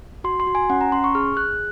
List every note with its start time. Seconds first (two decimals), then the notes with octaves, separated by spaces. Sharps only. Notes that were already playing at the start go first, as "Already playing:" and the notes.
0.24 F#4 C6
0.40 C6
0.47 F#4
0.55 G#5
0.70 C#4 F#5
0.81 A#5
0.92 C#4 C6
1.04 C#6
1.15 G#4 F6
1.37 G#4 F#6